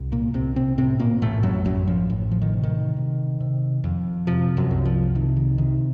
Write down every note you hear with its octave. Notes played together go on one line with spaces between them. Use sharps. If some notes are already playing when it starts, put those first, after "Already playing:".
Already playing: C2
A#2 A#3
C2 C3 C4
C3 C4
A2 C3 C4
A#2 A#3
A1 A2 A3
F#2 F#3
A1 F#2 F#3
F3
A2
F3
D#3
C3
D#3
C3
C3
F2
C3 F3
F#2 F#3
C2
F3
C3 D#3
D#3
C3 D#3